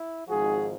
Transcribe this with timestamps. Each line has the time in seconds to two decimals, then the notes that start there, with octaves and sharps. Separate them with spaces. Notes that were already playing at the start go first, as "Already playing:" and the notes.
Already playing: E4
0.28 G#1 G#2 F3 F#4 G#4